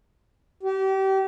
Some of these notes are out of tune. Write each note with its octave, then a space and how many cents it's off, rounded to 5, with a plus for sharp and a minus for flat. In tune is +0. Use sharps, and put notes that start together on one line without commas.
G4 -30